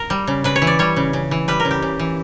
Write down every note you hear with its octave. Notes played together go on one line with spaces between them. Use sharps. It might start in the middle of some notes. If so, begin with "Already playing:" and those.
Already playing: A#4
G3
C#3
C#3 B4
C#5
E3
D5
G3 C#5
C#3
C#3
E3
G3 B4
A#4
C#3
G4
C#3
E3